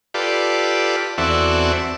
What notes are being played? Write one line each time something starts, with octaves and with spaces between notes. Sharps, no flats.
F4 G4 A4 B4 D5
E2 C4 F#4 A4 D5 E5